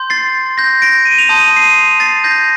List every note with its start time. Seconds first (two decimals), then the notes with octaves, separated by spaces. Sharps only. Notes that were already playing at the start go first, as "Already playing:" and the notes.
Already playing: C6 G6
0.10 A6 C7
0.58 G6 A#6
0.82 A#6 D7
1.05 D#7
1.18 F7
1.29 A5 C6 D#6 G6 D#7
1.44 F7
1.56 C7 D#7
2.00 A6 C7
2.24 G6 A#6